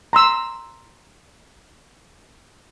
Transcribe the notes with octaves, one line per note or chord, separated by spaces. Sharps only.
A#5 C6 E6